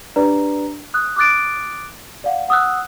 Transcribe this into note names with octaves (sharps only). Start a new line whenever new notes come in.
D4 G4 B4 D5 A#5
D#6 F#6
D6 D#6 F#6 A6 D7
D5 F5 F#5
F#5 D#6 E6 F#6